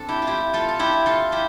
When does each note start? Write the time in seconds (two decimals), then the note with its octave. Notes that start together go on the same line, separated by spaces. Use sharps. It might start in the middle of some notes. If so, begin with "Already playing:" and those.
Already playing: C4 D4 A4
0.09 E4 G4
0.22 F4
0.27 E4 G4
0.54 F4 A4
0.69 A4
0.79 E4 G4
1.06 F4 A4
1.32 E4 G4